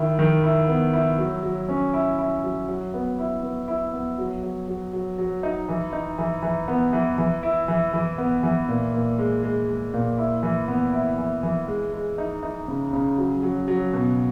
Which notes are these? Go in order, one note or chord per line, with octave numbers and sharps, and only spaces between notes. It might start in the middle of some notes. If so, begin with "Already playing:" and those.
Already playing: D#3 E4
D#3
E4
B3
E4
F#3
F#3
C#4
E4
E4
F#3
F#3
B3
E4
B3
E4
B3
F#3
F#3
F#3
F#3
F#3
D#4
E3
D#4
E3
E3
B3
E3
E3
E4
E3
E3
B3
E3
A#2
A#2
G#3
G#3
G#3
A#2
E4
E3
B3
E4
E3
E3
G#3
G#3
D#4
D#4
C#3
C#3
F#3
F#3
F#3
B2